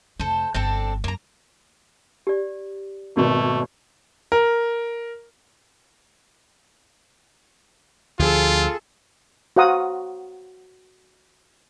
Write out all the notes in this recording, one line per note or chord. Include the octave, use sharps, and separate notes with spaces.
F1 E4 A4 C5
G1 C4 D4 A4
F#2 A#3 A#5
G4 D5
G#1 B2 A3 F#4
A#4
D2 F3 F4 G#4 A4
F#4 C5 F5 F#5 A#5 D#6